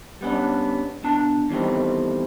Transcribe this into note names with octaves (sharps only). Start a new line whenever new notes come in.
G3 B3 C#4 D4
B2 D4 A5
E2 D#3 G3 A3 C4